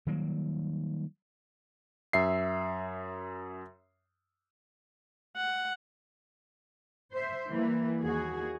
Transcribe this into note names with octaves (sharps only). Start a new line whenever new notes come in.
D#3 F#3 G3 A#3
F#2 E5 C7
F#5
C5 E5
E3 G3 A#3
D#2 F#4 G#4